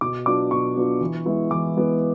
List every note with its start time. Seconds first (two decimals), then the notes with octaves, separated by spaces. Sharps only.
0.01 B2 D6
0.26 F#3 B3 D4 F4 D6
0.51 B2 C#6
0.75 F#3 B3 D4 F4
1.01 E3
1.26 G#3 B3 E4
1.51 E3 D6
1.75 G#3 B3 E4